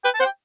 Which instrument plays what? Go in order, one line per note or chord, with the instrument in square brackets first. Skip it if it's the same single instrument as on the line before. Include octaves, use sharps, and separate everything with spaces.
[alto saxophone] B4 [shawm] G5
[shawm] A5
[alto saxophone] C5 [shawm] F#5
[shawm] G5